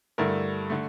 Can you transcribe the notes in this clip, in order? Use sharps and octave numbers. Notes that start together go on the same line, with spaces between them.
G2 D3 A3 E4 A#4
D3 A3